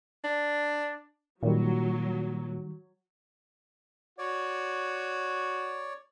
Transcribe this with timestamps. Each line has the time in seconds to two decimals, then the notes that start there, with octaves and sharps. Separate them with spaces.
0.24 D4
1.43 A#2 D#3 F#3 G3
4.18 F#4 C#5 D5